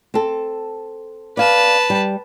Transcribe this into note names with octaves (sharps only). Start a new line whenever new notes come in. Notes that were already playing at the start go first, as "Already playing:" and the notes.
C4 A4
B4 D5 F5 A5
G3